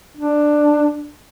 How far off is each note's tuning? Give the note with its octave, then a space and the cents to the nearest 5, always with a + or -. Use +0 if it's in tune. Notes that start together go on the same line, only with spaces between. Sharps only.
D4 +10